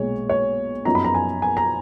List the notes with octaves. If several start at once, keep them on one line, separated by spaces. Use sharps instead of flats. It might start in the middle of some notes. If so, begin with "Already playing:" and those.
Already playing: B1 A#2 G#3 C#5
C#5
F#2 F3 B3 D#4 A#5
B5
A#5
G#5
G#5
A#5